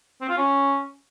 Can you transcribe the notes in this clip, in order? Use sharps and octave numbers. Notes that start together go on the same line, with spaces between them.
C4
F4
C#4